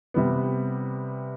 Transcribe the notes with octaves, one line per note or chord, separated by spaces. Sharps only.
C3 G3 B3